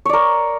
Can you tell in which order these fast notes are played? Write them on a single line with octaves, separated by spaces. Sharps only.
C#5 D5 A#4